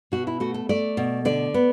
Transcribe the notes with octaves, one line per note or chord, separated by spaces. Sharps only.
B2 F#4
E4
A3 F#4
A4
A3 D5
B2
D3 D5
B3